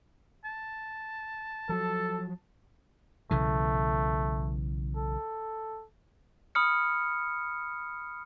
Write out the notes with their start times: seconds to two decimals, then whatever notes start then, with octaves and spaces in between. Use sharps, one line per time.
0.45 A5
1.69 F3 F#3 A4
3.31 B1 C#3 E3 A3
4.96 A4
6.55 B5 D#6 F6 C#7